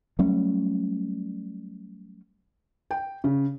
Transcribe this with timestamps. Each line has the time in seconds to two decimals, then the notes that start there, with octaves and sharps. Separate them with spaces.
0.19 F#3 G3 A3 C#4
2.91 G5
3.24 C#3